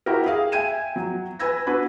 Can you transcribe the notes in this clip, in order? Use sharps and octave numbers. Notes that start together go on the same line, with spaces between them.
E4 F#4 G4 A#4
G#4 F5
E5 G5 G#5 G#6 D#7 E7
F#3
B4 G#5 E6 G#6 A#6
B3 D4 F#4 B4